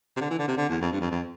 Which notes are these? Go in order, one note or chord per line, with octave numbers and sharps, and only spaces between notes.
C3
D3
E3
D3
C3
D3
E2
F2
G2
F2
F2